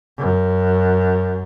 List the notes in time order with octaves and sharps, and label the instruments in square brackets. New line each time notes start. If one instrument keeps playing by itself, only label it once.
[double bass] F#2